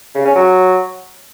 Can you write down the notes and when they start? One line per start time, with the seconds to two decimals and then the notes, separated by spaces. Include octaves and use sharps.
0.15 C#3
0.25 C#4
0.35 F#3